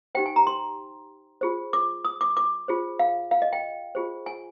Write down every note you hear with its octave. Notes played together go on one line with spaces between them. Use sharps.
D#4 G4 C5 G5
G#5
A#5
C6
F4 G#4 C5
D6
D#6
D6
D6
F4 G#4 C5
F5
F5
D#5
G5
F4 G#4 C5
G#5